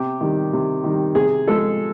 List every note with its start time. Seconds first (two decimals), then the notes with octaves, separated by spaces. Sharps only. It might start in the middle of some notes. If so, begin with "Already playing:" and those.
Already playing: C3 G4
0.21 D#3 G3
0.53 C3
0.84 D#3 G3
1.15 C3 G#4
1.47 F3 G#3 A4